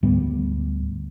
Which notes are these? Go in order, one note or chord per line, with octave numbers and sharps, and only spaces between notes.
D2 G#2 G3 B3